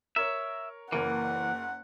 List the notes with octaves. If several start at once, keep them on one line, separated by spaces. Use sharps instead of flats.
A#4 C#5 E5
F#1 E3 A#3 F#5